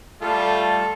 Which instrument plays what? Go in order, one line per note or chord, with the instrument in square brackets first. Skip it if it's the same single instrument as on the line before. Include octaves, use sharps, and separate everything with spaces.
[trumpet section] G3 A3 F4 [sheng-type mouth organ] A4